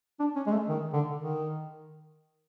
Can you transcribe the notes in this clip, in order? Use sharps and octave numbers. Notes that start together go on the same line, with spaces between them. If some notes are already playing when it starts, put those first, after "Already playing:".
D4
C#4
G#3
A3
D#3
D3
D#3